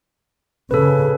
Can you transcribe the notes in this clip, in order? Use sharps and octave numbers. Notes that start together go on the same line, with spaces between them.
C#3 A4 B4